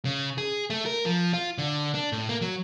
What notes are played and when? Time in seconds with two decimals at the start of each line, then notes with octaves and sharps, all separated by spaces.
0.05 C#3
0.38 G#4
0.70 A3
0.86 A#4
1.06 F3
1.33 F4
1.58 D3
1.95 D4
2.12 A2
2.29 A#3
2.41 F#3